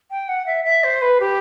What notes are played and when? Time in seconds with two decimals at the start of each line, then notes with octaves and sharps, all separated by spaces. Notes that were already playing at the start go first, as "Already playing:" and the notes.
0.11 G5
0.28 F#5
0.46 E5
0.65 E5
0.84 C5
1.02 B4
1.20 G4